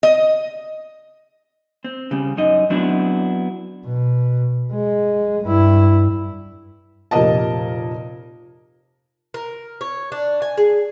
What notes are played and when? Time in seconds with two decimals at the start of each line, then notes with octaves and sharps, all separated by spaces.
0.03 D#5
1.84 C4
2.11 C#3 G3
2.37 F#2 D#4 D#5
2.70 F#3 B3 C4 D4 E4
3.87 B2
4.73 G#3
5.44 G2 E4
7.11 F1 A#2 G4 A#4 D#5 A5
9.34 A#4
9.81 C#5
10.12 D4
10.42 G#5
10.58 G#4